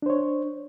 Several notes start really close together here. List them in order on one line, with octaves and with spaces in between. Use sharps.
D4 C5 C#5